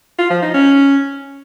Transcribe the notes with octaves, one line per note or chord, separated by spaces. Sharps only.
F4
F3
D#4
C#4